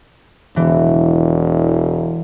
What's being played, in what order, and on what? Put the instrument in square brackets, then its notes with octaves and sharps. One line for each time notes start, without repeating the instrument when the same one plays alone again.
[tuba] E1 [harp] E3